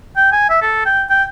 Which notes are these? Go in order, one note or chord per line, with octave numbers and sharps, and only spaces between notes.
G5
G#5
E5
A4
G5
G5